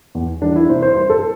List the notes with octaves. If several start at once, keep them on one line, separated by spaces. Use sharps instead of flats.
E2
E3 G3 D4
E4
C3 C5
C5
G3 C5
A4